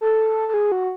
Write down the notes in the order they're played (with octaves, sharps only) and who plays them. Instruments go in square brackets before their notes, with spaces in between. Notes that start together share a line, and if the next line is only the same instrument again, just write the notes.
[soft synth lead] A4
A4
G#4
F#4